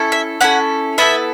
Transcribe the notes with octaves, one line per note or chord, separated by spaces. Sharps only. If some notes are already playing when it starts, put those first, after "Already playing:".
Already playing: C#4 E4 A4
E5
C#4 E4 A4 F#5
B3 E4 A4 E5